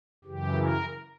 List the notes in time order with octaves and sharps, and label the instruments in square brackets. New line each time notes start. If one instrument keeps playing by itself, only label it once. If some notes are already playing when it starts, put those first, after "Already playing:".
[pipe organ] F#2 C#3 E3 G4
A#4